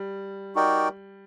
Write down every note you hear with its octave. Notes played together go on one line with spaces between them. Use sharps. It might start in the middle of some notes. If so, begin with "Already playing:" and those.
Already playing: G3
D#4 F#4 A#4 D5 G5